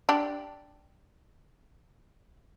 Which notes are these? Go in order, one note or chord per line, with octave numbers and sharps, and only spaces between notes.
D4 G4